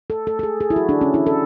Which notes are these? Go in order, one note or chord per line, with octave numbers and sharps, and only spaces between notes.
A4
A4
A4
G#4
G#4
E4
F#4
D4
C#4
E4
A4